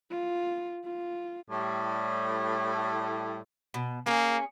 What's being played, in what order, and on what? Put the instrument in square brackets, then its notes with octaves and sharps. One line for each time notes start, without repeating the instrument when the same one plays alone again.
[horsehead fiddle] F4
F4
[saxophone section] A2 G3
[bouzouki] B2
[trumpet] A#3 [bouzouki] C#4 G#4